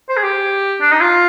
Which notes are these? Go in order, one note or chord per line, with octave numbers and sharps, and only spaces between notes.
C5
G#4
G4
D4
D#4
F4